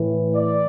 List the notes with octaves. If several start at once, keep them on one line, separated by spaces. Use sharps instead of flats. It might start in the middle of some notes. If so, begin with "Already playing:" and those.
Already playing: A2 E3
D5